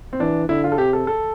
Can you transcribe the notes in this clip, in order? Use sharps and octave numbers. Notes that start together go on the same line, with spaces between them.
C4
E3 D4
D3 E4
F4
A4
C3 G4
A4
A4